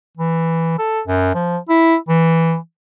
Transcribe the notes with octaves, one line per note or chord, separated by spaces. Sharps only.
E3
A4
F#2
F3
E4
E3